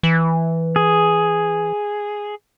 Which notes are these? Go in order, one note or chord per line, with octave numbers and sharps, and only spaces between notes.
E3
G#4